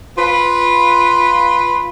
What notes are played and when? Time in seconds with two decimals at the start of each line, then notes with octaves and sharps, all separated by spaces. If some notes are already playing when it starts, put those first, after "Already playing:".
0.17 F4 B4